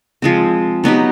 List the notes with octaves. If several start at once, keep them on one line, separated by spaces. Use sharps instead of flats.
F3 G#3 C4
F#3 B3 D#4 G4